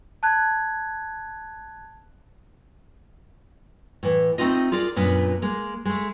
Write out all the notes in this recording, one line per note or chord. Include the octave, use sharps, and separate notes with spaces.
A5 F#6 G#6
A2 E3
A3 C4 D#4 F4 D#5
F4 G#4 A#4 D5
F#2 A#2 B3 D4
G#3 A#3
G#3 A3